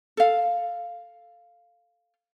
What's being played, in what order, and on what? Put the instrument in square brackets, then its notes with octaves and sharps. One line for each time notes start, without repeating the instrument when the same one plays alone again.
[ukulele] A4 F5